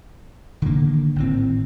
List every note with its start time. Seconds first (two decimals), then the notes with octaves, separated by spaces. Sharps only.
0.62 D3 D#3 A#3
1.16 G#1 A2 C4